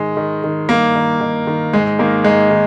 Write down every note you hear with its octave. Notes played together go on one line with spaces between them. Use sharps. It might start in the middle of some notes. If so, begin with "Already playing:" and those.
Already playing: G#2 D#3 G#3
D#3
D#3
G2 A#3
D#3
D#3
D#3
G#2 G#3
D#3 A#3
G#2 G#3
D#3